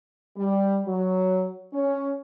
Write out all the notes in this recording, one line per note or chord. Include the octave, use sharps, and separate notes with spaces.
G3
F#3
C#4